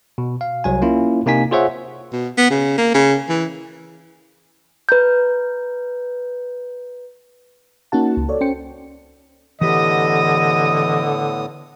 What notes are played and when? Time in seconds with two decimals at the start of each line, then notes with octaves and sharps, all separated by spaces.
0.18 B2
0.41 F5
0.64 C2 F#3 G#5
0.82 A#3 C#4 E4 F4
1.26 C3 A#3 D#4 G#5 B6
1.52 F4 G#4 C5 C#5 E5 F#5
2.13 B2
2.38 B3
2.50 C#3
2.78 A#3
2.94 C#3
3.29 E3
4.89 B4 A#5 G6
7.92 A#3 C#4 D#4 F#4 F#5 A5
8.17 C#2
8.29 A4 C#5 D5
8.41 C#4 C5 G5 C#7
9.61 A2 D3 E3 B3 G4 D#5 D#6